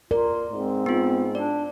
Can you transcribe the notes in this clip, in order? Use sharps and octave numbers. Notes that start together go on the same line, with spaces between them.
F4 A#4 D5
G#2 C4
B3 F4
D4 D5